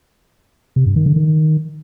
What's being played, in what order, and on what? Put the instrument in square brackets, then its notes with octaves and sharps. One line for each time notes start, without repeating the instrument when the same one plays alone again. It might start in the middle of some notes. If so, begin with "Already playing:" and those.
[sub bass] C3
G2
D#3
D3
D#3